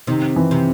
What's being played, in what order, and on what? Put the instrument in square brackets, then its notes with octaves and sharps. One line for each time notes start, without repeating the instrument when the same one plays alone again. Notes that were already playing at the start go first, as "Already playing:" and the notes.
[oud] C3 [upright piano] D#3
[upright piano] E3
[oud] C3